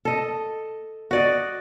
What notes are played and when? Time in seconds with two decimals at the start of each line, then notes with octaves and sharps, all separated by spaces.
0.05 A4 D#5
1.11 F#4 D5 D#5